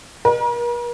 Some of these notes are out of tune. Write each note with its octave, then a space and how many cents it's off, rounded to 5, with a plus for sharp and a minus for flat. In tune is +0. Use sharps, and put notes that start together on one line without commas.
A#4 +45